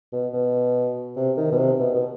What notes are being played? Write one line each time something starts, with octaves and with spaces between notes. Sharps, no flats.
B2
B2
C3
D#3
B2
C3
B2
B2